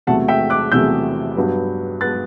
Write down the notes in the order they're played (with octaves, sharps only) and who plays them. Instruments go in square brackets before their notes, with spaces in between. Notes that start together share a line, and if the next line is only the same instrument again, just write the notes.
[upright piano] E2 C3 F#3 A3 F#5 A5
E5 G5
D6 F#6
E2 C3 F#3 A3 E6 G6
G2 F#3 B3
F#3 B3 F#6 A6